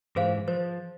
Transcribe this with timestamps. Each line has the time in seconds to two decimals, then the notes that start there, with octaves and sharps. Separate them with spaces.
0.16 G#2 E3 G#4 C5 F5
0.48 F3 C5